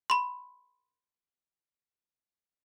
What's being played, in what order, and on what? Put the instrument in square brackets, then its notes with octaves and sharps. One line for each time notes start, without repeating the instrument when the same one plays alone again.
[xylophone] B5 C6